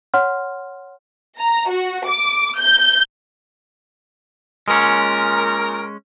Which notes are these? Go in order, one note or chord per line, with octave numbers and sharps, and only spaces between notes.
C#5 F#5 C6 F6
A#5
F#4
D6
G6
A#2 G#3 C#4 A#4